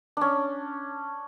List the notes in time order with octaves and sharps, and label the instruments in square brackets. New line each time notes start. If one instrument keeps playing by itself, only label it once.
[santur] C#4 D4